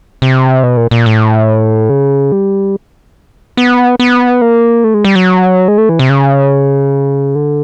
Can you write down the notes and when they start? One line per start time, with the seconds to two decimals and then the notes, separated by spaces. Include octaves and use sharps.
0.22 C3
0.63 B2
0.77 A#2
0.91 A#2
1.06 A2
1.89 C#3
2.32 G3
3.57 B3
3.99 B3
4.42 A#3
4.84 A3
4.94 G#3
5.04 G3
5.15 F#3
5.68 G#3
5.78 A3
5.89 E3
5.99 C3
6.10 C#3
7.35 D3